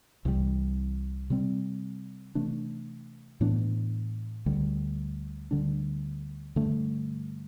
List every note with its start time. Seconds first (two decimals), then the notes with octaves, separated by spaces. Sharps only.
0.25 C2 C3 E3 G3
1.30 C3 G3 C4
2.35 C3 E3 A3 D4
3.41 A2 E3 B3 D4
4.46 D2 D3 G3
5.51 D2 D3 G3 D4
6.56 G2 D3 A3